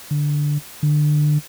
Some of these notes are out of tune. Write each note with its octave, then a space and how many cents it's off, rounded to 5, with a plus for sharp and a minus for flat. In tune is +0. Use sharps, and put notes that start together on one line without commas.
D3 +0
D3 +25